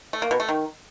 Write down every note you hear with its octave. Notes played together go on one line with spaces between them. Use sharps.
A3
A#3
B2
A3
D#3